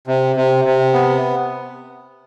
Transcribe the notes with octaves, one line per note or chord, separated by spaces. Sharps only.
C3
C3
C3
B3